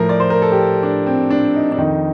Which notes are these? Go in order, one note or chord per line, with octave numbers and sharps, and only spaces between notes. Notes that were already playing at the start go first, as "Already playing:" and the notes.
Already playing: A2 F3 A#4
D5
C5
A#4
A4
G4
D4
C4
D4
D#4
D4
F2 D#3 D#4